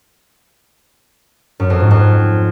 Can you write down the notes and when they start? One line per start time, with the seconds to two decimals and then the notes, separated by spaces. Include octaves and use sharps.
1.60 F#2
1.70 F2
1.80 G#2
1.91 F2